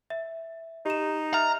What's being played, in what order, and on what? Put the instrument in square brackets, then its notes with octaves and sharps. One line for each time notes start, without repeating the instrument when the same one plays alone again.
[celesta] E5
[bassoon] D#4 [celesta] G4 E7
[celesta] E5 F6 [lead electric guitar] A#5